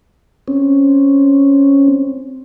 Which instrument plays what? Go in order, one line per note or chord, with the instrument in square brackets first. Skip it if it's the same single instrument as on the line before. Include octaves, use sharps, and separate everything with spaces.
[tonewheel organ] C4 C#4